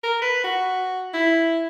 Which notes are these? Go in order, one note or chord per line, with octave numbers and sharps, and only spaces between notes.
A#4
B4
F#4
E4